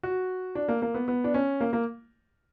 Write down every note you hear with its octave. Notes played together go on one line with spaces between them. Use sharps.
F#4
D4
A#3
A#3
B3
B3
D4
C#4
A#3
A#3